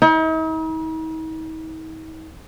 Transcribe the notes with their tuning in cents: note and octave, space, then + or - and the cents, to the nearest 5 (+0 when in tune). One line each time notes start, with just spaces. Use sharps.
D#4 +45